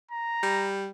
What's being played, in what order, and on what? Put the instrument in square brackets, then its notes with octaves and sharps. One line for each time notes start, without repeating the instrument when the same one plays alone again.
[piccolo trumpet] A#5
[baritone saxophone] G3